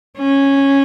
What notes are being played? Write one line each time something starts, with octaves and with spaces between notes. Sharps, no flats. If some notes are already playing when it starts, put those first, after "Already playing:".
C#4